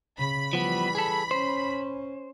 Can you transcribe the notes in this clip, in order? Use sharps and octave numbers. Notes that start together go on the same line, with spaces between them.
C#3 B5
E3 F3 G3 B3
G#4 A4
C#4 C5